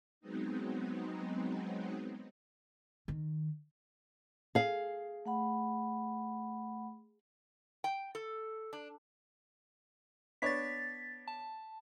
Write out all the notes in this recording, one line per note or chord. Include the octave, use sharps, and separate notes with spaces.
F#3 G#3 B3 C4 D#4
D#3
G#4 F5
A3 F#5 B5
G5
A4
D4
B3 D4 C#5 A6 B6
A5